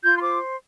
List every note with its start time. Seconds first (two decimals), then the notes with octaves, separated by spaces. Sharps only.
0.02 F4 G6
0.16 C6
0.21 C5 D6